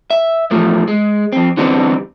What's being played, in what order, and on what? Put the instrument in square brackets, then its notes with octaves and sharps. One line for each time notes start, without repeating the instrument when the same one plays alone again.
[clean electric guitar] E5
E2 A2 F3 A3
G#3
F2 C4
D3 E3 G3 B3 C4 D4